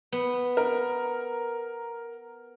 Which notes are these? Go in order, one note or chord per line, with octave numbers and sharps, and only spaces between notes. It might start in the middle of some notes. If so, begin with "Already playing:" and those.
B3
A#4